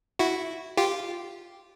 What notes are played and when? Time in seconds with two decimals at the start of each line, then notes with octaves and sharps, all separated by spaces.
0.19 E4 F#4
0.77 F4 G4